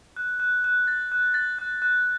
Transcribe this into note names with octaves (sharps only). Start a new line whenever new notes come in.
F#6
F#6
F#6
A6
F#6
A6
F#6
F#6